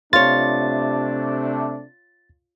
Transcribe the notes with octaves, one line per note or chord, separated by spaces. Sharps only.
C3 A3 D4 F4 C#5 A6